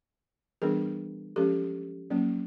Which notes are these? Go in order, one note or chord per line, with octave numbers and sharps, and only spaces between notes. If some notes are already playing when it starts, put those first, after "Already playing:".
E3 G3 B3 D4 G#4 A#4
F3 G#3 C#4 G4 A4
F#3 A#3 C#4